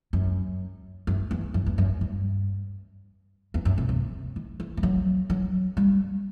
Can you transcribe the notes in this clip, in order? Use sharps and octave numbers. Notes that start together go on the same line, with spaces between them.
F#2
F#2
E2
F#2
E2
F#2
G2
E2
F#2
C3
C3
D#3
E3
G3
F#3
F#3
G3